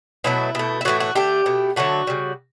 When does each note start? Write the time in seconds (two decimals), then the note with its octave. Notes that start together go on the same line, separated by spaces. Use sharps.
0.24 B2 F#3 A3 E4
0.55 B2 A3
0.81 E4
0.85 A2 E3 A3 F#4
1.00 F#4
1.15 D3 A3 G4
1.46 B2 A3
1.76 D3 F#3 A3 F#4
2.07 C#3 G3